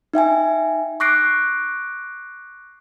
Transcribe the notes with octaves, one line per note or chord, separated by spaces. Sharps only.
D#4 E5 G5 G#5
C#6 D6 F#6 A#6 C7 D7